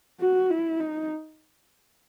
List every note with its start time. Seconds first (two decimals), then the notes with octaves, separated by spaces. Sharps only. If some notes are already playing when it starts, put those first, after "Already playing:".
0.21 F#4
0.50 E4
0.80 D#4